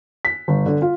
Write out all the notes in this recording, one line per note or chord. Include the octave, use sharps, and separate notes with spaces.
B6
G1
D3
F4